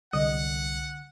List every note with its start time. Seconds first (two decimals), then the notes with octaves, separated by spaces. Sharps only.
0.13 C2 D3 D#5 F#5